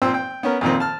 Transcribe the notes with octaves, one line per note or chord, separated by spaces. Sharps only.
A#2 C4 C5 G5 E6
G5
B3 C#4 A#4
F2 A#2 D#3 C4
A5 F6